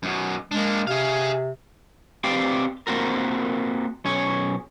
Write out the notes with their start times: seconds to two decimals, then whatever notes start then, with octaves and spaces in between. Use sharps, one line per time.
0.03 F#2 B2
0.51 G#3 A#3 D4
0.87 C3 G#4 F5
2.24 C4 G4 B4 D5 F5 G5
2.87 A#3 C4 F#4 A#4
4.05 B1 C#4 C#5